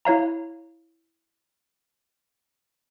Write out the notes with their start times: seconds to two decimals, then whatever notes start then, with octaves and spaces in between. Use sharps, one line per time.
0.05 E4 C#5 F5 A#5